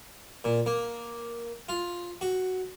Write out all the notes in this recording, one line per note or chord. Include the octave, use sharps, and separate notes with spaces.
A#2
A#3
F4
F#4